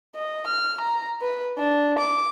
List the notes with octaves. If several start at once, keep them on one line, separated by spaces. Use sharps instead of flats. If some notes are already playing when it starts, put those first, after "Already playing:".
D#5
F6
A#5
B4
D4
D6